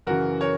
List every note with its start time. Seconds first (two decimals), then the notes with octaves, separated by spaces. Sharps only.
0.07 F#2 C#3 E3 F#4 A#4
0.41 A#4 C#5